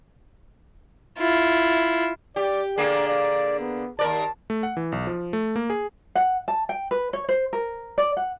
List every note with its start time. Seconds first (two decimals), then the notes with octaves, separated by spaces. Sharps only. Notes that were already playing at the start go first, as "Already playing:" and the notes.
1.19 E4 F4
2.36 G4 D5
2.78 D3 A#3 G#4 D5
3.08 D5
3.60 B3
3.99 D#2 A#4 D5 A5
4.50 A3
4.63 F#5
4.77 E3
4.92 B1
5.07 F3
5.33 A3
5.56 A#3
5.70 G#4
6.15 F#5
6.48 A5
6.69 G5
6.91 B4
7.13 C#5
7.29 C5
7.53 A#4
7.98 D5
8.17 F#5